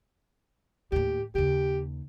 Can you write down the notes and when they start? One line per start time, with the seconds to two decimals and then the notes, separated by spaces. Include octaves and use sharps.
0.92 D#2 A2 G4
1.35 D#2 C#3 G4